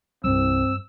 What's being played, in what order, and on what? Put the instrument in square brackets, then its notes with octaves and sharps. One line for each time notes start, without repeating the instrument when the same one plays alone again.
[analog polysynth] C2 [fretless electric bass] G2 G3 [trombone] C4 [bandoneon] E6